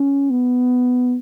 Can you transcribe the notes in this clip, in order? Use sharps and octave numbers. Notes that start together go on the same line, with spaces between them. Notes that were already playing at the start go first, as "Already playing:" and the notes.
Already playing: C#4
B3